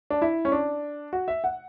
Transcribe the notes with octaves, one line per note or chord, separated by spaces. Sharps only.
D4
E4
C#4
D4
F#4
E5
F#5